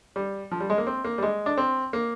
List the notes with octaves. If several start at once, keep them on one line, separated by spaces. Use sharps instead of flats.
G3
F3
G3
G#3
A#3
C4
A#3
G3
G#3
D4
C4
A#3